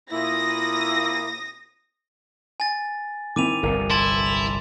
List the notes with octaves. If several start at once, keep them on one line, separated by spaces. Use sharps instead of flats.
A#2 A#3 E4 D#6 A#6
G#5 A6
D#3 C4 E4 D6 D#7 F7
G1 C2 F2 A#4
E4 A5 C6 A6
F7